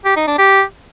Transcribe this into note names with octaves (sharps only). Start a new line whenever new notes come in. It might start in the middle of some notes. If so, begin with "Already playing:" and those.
G4
D#4
D4
G4